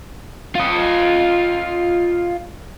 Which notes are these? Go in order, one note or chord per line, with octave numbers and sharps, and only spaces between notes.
F4 D#5